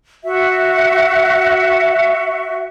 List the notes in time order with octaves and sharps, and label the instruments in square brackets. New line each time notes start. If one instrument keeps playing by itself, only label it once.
[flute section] F#4 E5